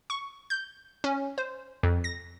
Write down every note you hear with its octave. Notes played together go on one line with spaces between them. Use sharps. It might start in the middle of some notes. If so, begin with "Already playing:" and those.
C#6
G6
C#4
C5
F2
A#6